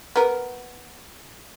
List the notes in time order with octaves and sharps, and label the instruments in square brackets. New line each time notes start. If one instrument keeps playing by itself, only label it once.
[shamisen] B3 A#4